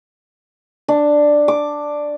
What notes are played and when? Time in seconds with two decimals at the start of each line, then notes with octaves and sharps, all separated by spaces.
0.88 D4
1.48 D6